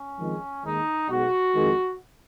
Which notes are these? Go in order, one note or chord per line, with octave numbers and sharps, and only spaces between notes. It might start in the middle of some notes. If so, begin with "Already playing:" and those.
Already playing: C#4
F2 D#3 G#3
D#2 D#3 G#3 D#4
B1 B2 G#3 F#4
F2 D#3 G#3